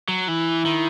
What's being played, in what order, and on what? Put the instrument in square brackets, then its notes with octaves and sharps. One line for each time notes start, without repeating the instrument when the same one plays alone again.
[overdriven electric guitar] F#3
[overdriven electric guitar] E3 [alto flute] E4
[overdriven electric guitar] D#3